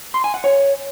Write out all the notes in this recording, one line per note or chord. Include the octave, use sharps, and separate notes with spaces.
C6
G#5
F#5
C#5